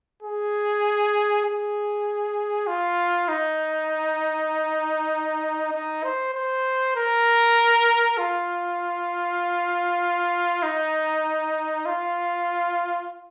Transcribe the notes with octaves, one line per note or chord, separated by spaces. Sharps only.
G#4
G#4
F4
D#4
D#4
C5
C5
A#4
F4
D#4
F4